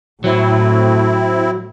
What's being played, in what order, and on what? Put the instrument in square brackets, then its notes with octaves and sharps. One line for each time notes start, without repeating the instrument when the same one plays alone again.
[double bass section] A2 [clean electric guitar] F#3 [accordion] C4 E4